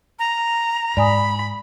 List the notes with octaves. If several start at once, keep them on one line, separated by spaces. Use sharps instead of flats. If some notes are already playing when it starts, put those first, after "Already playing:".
A#5
G#2 D5 G#5 B5 D#6